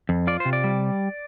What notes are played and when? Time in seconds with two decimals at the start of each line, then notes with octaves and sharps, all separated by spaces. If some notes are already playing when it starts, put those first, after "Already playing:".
0.09 F2
0.27 F4 D5
0.40 C5
0.45 C3
0.53 D5
0.64 G3